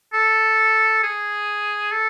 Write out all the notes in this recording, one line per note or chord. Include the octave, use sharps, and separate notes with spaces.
A4
G#4
A4